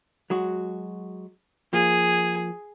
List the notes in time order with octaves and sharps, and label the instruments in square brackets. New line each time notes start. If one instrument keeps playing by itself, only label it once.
[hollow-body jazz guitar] F#3 G#3 F#4
[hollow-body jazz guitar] F3 A#3 [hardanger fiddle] G#4